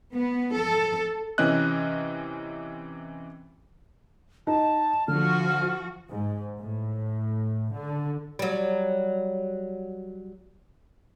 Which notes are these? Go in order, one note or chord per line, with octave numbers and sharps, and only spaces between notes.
B3
A4
C3 E3 C4 C#4 D#5 F#6
D#4 A5
D3 F3 F#4 F6
G#2
A2
D3
F#3 G3